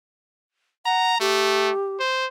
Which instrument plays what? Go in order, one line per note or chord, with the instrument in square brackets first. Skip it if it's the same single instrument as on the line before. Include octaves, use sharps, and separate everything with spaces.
[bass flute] F#5 [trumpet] A#5
[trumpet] A3 [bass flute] G4
[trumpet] C5